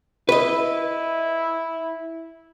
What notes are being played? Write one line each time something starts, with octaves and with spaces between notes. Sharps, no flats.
E4 B4 D#5